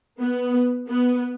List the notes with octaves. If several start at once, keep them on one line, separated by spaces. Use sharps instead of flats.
B3
B3